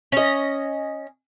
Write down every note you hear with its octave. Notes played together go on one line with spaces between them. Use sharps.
C#4 D#5